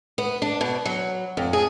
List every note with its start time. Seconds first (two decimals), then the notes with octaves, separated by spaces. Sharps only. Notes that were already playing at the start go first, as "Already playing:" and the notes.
0.18 B3
0.42 D4
0.61 B2
0.86 F#3
1.37 F2
1.53 G#4